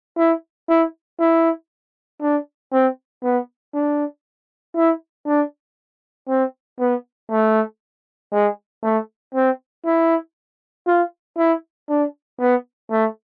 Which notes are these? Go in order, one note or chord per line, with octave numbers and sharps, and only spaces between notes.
E4
E4
E4
D4
C4
B3
D4
E4
D4
C4
B3
A3
G#3
A3
C4
E4
F4
E4
D4
B3
A3